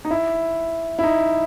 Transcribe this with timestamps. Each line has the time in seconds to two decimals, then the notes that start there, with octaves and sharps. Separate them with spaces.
0.05 D#4
0.11 E4
0.99 E4
1.03 D#4